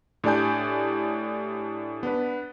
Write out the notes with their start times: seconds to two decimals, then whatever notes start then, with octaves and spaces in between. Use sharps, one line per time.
0.24 A2 D4 G4 D5 G#5 G6
2.03 B3 D4 B4